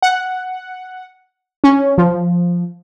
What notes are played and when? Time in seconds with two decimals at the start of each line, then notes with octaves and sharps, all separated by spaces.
0.02 F#5
1.64 C#4
1.98 F3